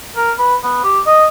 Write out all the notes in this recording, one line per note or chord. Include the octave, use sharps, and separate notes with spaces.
A#4
B4
B3
G4
D#5